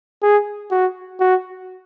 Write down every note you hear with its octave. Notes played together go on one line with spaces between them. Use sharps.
G#4
F#4
F#4